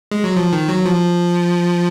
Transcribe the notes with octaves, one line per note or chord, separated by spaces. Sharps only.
G#3
F#3
F3
D#3
F#3
F3